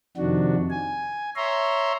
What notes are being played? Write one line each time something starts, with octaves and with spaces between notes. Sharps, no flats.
F2 C3 D#3 D4 F#4
G#5
C#5 E5 A#5 C6